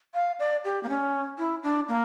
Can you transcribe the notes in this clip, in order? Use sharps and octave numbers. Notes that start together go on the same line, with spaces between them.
F5
D5
G4
A#3
C#4
E4
D4
A#3